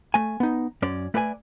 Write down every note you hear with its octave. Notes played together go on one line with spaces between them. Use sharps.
A3 G#5
B3 D#4
F#2 C#4 D5
A3 B4 D5 G5 G#5